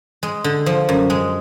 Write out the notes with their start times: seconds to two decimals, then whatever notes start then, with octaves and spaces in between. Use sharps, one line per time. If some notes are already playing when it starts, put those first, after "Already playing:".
0.23 G#3
0.44 D3
0.66 F3
0.89 F#2
1.10 G#3